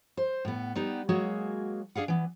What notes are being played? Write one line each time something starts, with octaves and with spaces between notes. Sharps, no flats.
C5
A2 B3
G3 B3 D#4
F#3 G#3 A#3 F#4 G#4
D4 G#4 F5 F#5
E3 B3